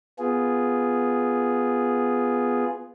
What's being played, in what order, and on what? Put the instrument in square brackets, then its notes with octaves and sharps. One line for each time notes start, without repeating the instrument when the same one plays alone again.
[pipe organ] B3 F4 G#4